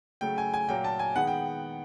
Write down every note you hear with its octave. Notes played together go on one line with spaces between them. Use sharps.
C#3 F#3 A3 G5
G#5
G#5
A#2 F#3 A#3 G5
A5
G#5
D#3 G#3 B3 F#5
G5